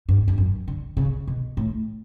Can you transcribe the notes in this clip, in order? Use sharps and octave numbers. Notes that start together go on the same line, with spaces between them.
G2
G2
F#2
D3
C#3
B2
A2